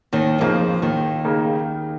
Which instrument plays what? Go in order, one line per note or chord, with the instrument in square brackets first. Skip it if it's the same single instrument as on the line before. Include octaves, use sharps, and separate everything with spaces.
[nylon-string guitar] D#2 D#3
[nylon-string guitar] F2 F3 [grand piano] C#3 A#3 D#4
[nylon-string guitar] D#2 D#3
[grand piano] C#3 A#3 D#4